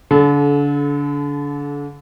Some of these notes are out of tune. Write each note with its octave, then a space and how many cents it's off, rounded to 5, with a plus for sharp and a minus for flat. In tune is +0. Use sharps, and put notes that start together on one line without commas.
D3 -30 A4 -40